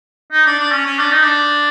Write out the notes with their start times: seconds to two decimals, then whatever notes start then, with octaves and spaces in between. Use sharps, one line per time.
0.32 D#4
0.46 D4
0.59 D4
0.72 C#4
0.86 C#4
0.99 D4
1.11 D#4
1.23 D4